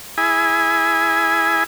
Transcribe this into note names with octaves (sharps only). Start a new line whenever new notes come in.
E4 G#4 G#5